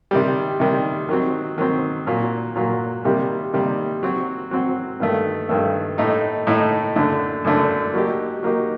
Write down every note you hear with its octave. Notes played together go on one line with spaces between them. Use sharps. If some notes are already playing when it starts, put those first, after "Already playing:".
C3 D#3 G3
C3 D#3 G3
D#3 F#3 C4
D#3 F#3 C4
A#2 F#3 A#3
A#2 F#3 A#3
C3 D#3 G3 A#3
C3 D#3 G3 A#3
F#3 C4 F#4
F#3 C4 F#4
G2 D#3 A3
G2 D#3 A3
A2 A3 D#4
A2 A3 D#4
F#2 D3 A3 D4
F#2 D3 A3 D4
F#3 A#3 D#4 G4
F#3 A#3 D#4 G4